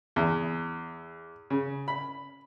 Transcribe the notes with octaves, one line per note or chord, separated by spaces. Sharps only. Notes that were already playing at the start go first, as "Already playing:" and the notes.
E2
C#3
B5